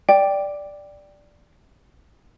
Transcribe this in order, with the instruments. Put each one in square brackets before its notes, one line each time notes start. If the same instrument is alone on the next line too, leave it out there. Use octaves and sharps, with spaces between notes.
[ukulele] D5 [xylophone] G5